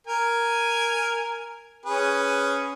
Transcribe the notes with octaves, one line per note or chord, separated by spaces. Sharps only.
A#4 G#5
C#4 G#4 B4